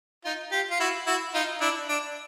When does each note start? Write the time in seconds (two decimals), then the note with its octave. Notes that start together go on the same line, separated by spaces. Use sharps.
0.24 D#4 F4
0.52 F4 G4
0.70 F4
0.80 E4 F#4
1.07 E4 F#4
1.34 D#4 F4
1.61 D4 E4
1.89 D4